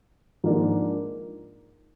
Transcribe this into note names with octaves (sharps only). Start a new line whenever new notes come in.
G#2 F3 A#3 D4